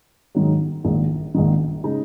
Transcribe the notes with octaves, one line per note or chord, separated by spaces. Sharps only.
G#2 D#3 F#3
A#1 G#2 D#3
A#1 G#2 D#3
C#3 G#3 D#4